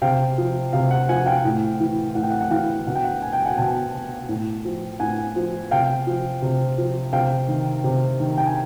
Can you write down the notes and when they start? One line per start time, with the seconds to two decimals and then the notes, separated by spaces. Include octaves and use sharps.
0.02 C3 F5 G5
0.38 F3
0.73 C3 F5
0.91 F#5
1.09 F3 F#5 G#5
1.26 F5 G5
1.45 A2
1.80 E3
2.15 A2 F#5
2.23 G5
2.30 F#5
2.41 F#5
2.50 E3 F5 G5
2.87 B2 F#5
2.95 G5
3.04 F#5
3.22 G#5
3.33 G5
3.45 F#5 G#5
3.58 B2 G5 A5
4.29 A2
4.65 F3
4.99 A2 F#5 G#5
5.36 F3
5.71 C3 F5 G5
6.07 F3
6.42 C3
6.78 F3
7.13 C3 F5 G5
7.48 D#3
7.84 C3
8.20 D#3
8.38 G5
8.46 G#5